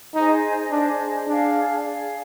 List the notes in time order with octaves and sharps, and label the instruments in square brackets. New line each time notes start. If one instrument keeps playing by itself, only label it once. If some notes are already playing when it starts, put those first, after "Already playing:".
[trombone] D#4 [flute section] G#4 C5 D#5
[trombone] D4 [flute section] G#4 C5 D#5
[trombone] D4 [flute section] G#4 D5 F5
[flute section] G#4 D5 F5